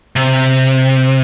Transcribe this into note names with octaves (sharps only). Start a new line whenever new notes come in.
C3